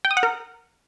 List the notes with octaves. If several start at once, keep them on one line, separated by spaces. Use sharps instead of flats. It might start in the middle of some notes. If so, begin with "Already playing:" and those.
G5
D#6
F#5
A#4